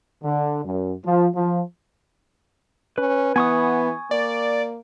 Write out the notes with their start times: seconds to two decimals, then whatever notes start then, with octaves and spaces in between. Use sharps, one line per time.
0.23 D3
0.64 F#2
1.05 F3
1.34 F3
2.98 C#4 B4
3.36 E3 B3 G#5 C#6 D#6
4.11 A#3 D5